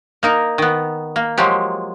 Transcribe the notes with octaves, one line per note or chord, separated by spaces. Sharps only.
A#3 D#4 A#4
D#3 B3
A#3
F3 F#3 G#3 G4